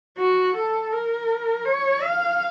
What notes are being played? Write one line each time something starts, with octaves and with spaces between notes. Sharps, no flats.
F#4
A4
A#4
C#5
F5